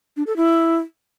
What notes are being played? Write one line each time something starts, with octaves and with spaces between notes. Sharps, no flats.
D4
A4
E4